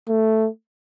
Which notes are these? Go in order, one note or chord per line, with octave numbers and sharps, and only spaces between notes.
A3